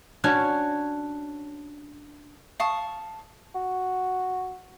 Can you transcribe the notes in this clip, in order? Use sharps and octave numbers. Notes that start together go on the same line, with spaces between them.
C#4 D4 F#4 C#5
F5 A5 C#6 D#6
F#4